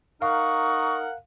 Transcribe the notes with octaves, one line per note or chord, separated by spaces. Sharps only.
D#4 A#4 F5 F#5 C#6